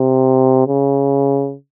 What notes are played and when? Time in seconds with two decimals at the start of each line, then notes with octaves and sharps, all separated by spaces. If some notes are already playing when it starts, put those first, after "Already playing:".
Already playing: C3
0.68 C#3